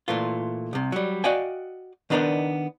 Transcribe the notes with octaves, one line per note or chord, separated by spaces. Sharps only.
A#2 E3 A3 F4
C2 C3
F#3 G3
F#4 D5 D#5 F5 G5 G#5
D#3 B3 D4 D#4 A#4 D5